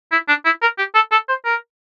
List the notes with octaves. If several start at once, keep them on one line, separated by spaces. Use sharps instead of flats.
E4
D4
E4
A#4
G4
A4
A4
C5
A#4